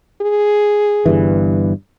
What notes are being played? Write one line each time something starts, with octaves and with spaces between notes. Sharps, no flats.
G#4
G1 G2 E3